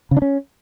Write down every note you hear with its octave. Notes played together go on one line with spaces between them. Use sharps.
C#3
D4
C#4